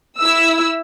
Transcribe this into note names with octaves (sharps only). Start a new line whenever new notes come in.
E4 E6